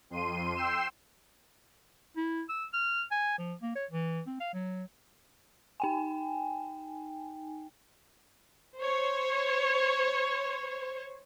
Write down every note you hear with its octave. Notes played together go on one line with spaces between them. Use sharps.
F2 C6 D#7
G5 C6 E6 C7 E7
E4
E6
F6
G#5
F3
A#3
C#5
E3
C4
F5
F#3
D#4 G5 G#5
C5 C#5